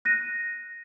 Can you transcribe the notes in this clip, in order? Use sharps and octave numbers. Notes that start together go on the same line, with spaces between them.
F#6 A#6 D#7